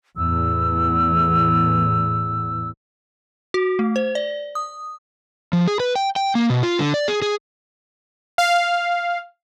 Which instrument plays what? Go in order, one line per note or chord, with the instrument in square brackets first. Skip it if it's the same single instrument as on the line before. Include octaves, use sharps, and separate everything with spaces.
[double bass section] E2 A2 [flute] E6
[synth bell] F#4
A3
C5
D5
D#6
[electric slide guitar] F3
G#4
B4
G5
G5
A#3
B2
F4
D3
D5
G#4
G#4
[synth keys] F5